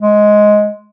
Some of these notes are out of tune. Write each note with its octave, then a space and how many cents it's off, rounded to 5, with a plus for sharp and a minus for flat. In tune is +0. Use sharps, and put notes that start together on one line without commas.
G#3 +10